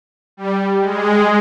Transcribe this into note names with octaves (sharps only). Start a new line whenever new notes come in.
G3
G#3